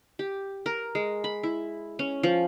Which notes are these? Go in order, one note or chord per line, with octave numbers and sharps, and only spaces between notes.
G4
A#4
G#3
B5
E4
C#4
F3